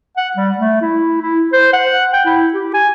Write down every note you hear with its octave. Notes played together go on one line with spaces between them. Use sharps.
F#5
G3
A3
E4
E4
C5
F#5
G5
E4
G4
G#5